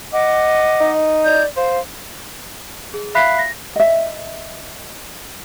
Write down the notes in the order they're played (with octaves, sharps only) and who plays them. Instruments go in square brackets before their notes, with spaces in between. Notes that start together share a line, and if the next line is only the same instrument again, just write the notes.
[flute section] D#5 F#5 D6
[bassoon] D#4
[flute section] D5 G6
[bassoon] C5 [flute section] F5
[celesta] G#4
E5 F5 B5 F#6 B6 C7
A#6
[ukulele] D#5 E5